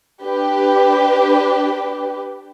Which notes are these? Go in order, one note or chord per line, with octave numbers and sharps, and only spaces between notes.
D4 G4 B4